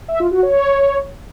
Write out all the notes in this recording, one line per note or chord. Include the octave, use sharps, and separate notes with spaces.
E5
F4
F#4
C#5